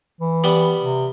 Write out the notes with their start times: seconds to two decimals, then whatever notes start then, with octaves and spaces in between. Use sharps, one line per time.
0.21 E3
0.44 G3 B3
0.81 C3